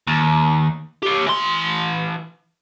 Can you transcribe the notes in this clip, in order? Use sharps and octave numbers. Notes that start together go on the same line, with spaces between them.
D#2
G4 C#5
E3 C6